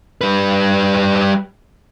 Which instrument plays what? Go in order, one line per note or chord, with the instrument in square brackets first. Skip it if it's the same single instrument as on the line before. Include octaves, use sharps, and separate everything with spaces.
[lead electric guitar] G3 B4